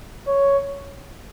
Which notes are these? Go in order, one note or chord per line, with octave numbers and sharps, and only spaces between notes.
C#5